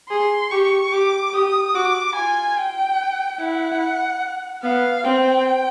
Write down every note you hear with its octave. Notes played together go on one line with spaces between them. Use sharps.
G#4 C6
G4 C#6
G4 D6
G4 D#6
F#4 D6
F4 G#5
G5
E4 F#5
B3 F5
C4 G5